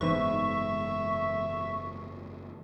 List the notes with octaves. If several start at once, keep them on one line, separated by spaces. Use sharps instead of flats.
F#1 G#2 E3 B3 B4 E5 C#6